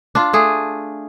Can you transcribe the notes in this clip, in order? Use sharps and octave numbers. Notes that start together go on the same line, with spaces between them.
D4 F4
A3 G#4